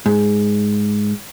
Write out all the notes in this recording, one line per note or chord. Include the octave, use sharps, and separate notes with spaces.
G#2